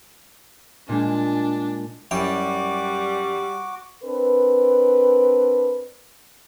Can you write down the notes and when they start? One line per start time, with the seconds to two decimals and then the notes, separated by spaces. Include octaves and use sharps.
0.89 A#2 G#3 D4
2.11 F#2 G3 E4 F#4 G5 D6
4.03 C4 D4 A#4 B4